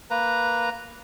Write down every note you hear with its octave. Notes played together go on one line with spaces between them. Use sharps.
A#3 B4 A#5